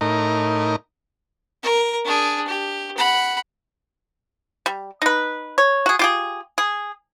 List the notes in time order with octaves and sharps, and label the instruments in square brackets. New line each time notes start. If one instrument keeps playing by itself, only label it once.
[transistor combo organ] A2 D#4 A#4
[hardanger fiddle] A#4
D4 G#4
G4
F#5 B5
[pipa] G3
D#4 B4
C#5
F#4 G#4
F4 G4 G#4
G#4